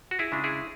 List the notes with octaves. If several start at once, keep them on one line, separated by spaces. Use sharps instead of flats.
F#4
E4 G#4
C#3 G#3 D4
E4 G#4